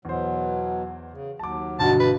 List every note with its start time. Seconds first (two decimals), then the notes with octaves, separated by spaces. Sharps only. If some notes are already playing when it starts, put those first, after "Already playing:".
0.05 E2 B2 F#3 C5
1.11 C#3
1.39 D#2 F#3 A5 D6
1.79 G1 G2 B2 F#5 A5
2.00 A#3 B4